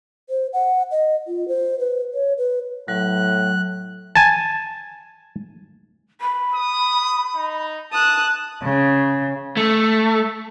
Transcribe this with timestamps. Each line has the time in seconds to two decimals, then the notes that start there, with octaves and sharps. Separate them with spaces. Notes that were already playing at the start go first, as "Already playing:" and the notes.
0.30 C5
0.53 F#5
0.91 D#5
1.27 F4
1.48 C5
1.79 B4
2.14 C#5
2.38 B4
2.88 A2 F#3 F#6
4.16 G#5 A5
6.21 B5
6.54 D#6
7.36 D#4
7.92 A5 D#6 F#6
8.63 C#3
9.57 A3